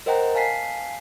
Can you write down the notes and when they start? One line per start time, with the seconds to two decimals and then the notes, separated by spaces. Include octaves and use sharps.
0.06 A#4 C5 D#5 F#5 G5 A#5
0.35 F5 G#5 A5 B6 C7